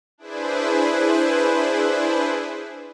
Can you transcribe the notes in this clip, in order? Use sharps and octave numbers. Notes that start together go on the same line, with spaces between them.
D4 E4 G#4 B4 C5